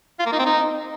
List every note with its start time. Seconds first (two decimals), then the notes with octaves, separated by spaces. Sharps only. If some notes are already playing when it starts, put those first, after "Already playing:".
0.19 F4
0.26 A#3
0.32 D#4
0.39 C4
0.45 D#4